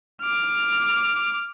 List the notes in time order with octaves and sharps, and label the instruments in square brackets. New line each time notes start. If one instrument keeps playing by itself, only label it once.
[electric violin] D6 F6